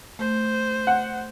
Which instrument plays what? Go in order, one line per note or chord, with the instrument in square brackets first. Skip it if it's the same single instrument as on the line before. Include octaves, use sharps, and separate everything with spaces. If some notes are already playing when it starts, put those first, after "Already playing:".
[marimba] A3 [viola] C5
[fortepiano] F#5